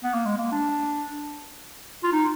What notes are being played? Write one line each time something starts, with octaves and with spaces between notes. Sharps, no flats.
B3
A#3
G#3
A#3
D4
F4
D#4